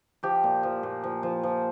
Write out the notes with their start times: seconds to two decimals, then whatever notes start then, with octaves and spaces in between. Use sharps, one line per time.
0.23 F3 G4
0.44 A#2
0.63 F3
0.83 A#2
1.04 F3
1.23 F3
1.43 F3